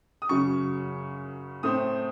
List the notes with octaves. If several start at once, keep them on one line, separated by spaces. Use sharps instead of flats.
D#6
F#2 C#3 F#3 C#6
A2 A3 C4 D#6